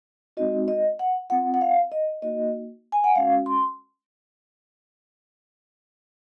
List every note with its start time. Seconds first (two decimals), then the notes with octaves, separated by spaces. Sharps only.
0.37 G#3 C4 D#4 F#4 D#5
0.68 D#5
0.99 F#5
1.30 C4 F4 F#5
1.54 F#5
1.61 F5
1.92 D#5
2.22 A#3 D#4 F#4 D#5
2.92 G#5
3.04 F#5
3.15 G#3 C#4 F#4 F5
3.46 C6